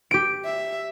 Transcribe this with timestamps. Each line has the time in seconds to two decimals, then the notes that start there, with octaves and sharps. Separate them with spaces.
0.11 G4 D7
0.45 E5